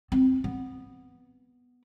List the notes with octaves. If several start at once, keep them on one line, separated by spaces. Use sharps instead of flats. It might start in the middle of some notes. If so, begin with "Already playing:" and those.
C4
B3